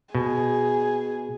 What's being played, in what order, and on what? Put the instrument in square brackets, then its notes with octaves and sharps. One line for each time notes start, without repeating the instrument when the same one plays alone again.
[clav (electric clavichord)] B2 [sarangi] G#4